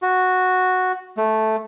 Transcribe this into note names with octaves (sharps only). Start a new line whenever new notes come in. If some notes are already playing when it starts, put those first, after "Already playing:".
F#4
A3